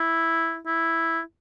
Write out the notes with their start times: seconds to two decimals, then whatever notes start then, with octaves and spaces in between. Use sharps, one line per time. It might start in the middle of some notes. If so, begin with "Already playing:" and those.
Already playing: E4
0.66 E4